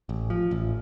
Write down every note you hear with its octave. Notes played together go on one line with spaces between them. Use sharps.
A1
F3
A1